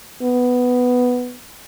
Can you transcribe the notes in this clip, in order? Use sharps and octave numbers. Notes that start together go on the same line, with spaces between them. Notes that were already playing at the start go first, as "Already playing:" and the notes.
B3